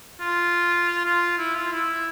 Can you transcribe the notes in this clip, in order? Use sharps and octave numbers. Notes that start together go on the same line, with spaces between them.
F4
F4
E4
F4
E4